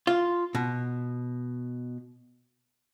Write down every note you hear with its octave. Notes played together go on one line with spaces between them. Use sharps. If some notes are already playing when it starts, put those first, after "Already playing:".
F4
B2